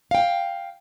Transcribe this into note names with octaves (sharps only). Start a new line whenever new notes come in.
F5 G5